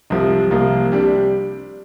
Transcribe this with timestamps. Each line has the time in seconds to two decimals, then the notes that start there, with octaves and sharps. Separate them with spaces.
0.10 C2 C3 F3
0.51 C2 C3 F3 A#3 F4
0.92 C3 G3 D4